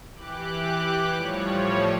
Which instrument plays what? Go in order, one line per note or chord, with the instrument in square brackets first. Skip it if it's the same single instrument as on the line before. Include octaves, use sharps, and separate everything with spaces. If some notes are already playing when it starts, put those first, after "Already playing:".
[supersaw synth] E3 G4 D6 F#6
A2 F3 G3 C#5